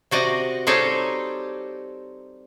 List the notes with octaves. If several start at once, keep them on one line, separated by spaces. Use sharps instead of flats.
C3 F#4 D5 D#5
G3 C4 D#4 G4 A4 C#5